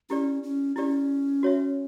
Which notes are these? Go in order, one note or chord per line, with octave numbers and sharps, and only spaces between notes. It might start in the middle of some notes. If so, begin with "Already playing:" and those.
C#4 E4 G4 D5
C#4
C#4 E4 G4 D5
F#4 C#5 E5